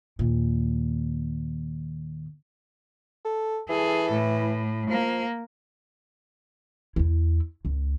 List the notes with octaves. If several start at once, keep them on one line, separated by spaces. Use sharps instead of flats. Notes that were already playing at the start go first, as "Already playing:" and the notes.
D#2 A#2
A4
E3 G#4 A4
A2
F3 A#3
E2 E4
C#2